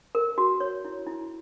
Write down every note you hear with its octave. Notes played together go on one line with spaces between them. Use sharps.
A#4
F#4
C#5
E4
E4